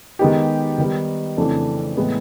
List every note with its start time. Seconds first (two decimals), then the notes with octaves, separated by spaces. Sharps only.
0.19 D#3 G#3 B3 D#4 G4
0.78 D#3 G3 B3 D#4
1.37 F2 C#3 E3 A3 D4
1.97 A2 E3 G#3 B3